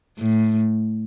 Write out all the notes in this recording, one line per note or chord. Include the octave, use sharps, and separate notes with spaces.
A2